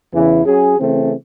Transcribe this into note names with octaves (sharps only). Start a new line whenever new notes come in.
E2 C#3 E3
F#3 C#4 G#4
C#3 E3 A3 C4